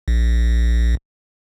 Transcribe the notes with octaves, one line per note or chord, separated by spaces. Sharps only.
A#1